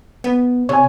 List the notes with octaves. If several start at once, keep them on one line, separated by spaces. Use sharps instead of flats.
B3
C3 C#5 G#5